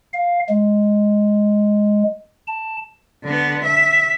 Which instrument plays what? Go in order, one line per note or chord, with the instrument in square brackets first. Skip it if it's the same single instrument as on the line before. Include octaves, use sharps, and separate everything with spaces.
[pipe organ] F5
G#3
A5
[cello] D3 B3
E5